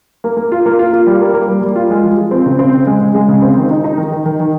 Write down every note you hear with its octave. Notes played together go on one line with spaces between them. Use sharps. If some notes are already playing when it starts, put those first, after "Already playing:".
A#3
A#3
F4
A#3
F4
F4
G3
A#3
A#3
G3
G3
F4
G#3
F3
F3
C4
C#3
C4
C#3
G#3
C#3
G#3
C#3
C4
D#3
D#4
D#4
D#3
D#3
D#3
D#3